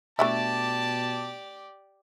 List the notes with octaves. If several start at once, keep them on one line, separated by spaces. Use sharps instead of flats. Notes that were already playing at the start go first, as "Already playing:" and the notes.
B2 A3 D4 E4 G4 D5 A5